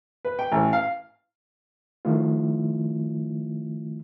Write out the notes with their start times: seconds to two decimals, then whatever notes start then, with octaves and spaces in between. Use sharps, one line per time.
0.25 B4
0.39 G5
0.52 A1
0.73 F5
2.05 D#3 F3 A3 E4 F4